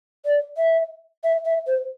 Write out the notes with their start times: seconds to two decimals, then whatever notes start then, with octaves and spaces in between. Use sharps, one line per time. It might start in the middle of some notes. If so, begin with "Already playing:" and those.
0.25 D5
0.57 E5
1.24 E5
1.45 E5
1.67 C5